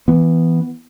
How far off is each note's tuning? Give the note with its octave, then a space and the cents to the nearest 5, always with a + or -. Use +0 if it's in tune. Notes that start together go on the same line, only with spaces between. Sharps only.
E3 +0 B3 +0